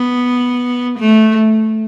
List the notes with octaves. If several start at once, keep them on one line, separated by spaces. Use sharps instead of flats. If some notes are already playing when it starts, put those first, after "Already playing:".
Already playing: B3
A3